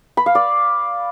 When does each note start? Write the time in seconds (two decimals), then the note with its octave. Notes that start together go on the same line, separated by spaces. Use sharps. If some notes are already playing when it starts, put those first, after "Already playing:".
0.17 B5
0.26 F5
0.35 D5